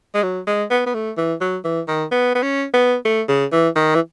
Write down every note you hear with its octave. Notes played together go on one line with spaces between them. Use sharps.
G#3
F#3
G#3
B3
B3
A3
E3
F#3
E3
D#3
B3
B3
C#4
B3
A3
C#3
E3
D#3
E3